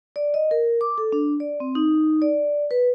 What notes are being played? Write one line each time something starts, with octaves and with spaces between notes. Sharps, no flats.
D5
D#5
A#4
D6
A4
D4
D5
C4
D#4
D5
B4